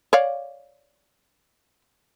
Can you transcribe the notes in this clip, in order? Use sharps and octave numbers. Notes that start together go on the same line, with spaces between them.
C#5 D5 F5